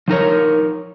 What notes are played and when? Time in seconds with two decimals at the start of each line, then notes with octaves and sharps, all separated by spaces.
0.08 F3 D#4 A#4 C#5